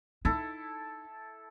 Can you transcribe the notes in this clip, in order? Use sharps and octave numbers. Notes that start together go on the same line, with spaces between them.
D#4 E4 A4